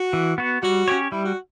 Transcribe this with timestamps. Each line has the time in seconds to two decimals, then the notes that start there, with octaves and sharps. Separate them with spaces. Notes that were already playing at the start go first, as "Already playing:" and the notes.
Already playing: F#4
0.13 E3
0.38 B3 F#4
0.63 G3 F#4
0.88 C#4 G4 C#5
1.12 G3 E4
1.26 F#4